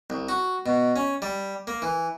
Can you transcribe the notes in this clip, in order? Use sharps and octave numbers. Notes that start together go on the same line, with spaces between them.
C2
F#4
B2
C#4
G3
A#3
E3